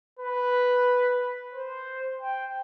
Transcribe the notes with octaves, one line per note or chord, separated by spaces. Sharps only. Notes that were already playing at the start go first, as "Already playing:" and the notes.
B4
C5
G5